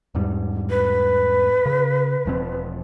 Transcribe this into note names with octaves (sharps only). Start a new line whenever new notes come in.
E2 G#2 G3
B4
C#3
E1 F3 C4